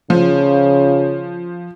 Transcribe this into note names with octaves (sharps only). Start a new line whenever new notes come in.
C#3 F3